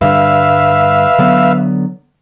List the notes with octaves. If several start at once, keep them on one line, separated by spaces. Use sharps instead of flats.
G2 D3 G3 B4 E5 F5
D3 F#3 B3